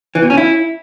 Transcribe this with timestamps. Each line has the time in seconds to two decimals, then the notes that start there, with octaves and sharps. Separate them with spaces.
0.15 E3
0.23 B2
0.30 C#4
0.37 E4